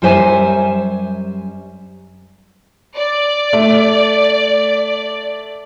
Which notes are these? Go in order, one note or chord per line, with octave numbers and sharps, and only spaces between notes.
F#2 G3 G4 C5 E5 G#5
D5
A3